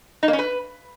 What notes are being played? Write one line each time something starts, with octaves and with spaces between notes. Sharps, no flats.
D#4
A#3
C#4
B4